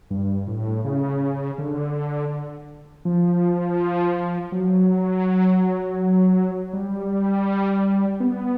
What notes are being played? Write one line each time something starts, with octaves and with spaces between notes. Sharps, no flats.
G2
A2
C#3
D3
F3
F#3
G3
B3